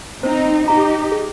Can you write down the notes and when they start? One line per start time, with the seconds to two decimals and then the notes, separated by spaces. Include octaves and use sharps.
0.23 C4 D#4 C5
0.68 D#4 G4 A#5
1.12 G#4